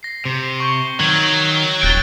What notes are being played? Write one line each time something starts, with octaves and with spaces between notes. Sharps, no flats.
A#6 C7
C3
C#6 G6 G7
D#3 F#3 G#6 F#7
D#1 G5 F#6 A6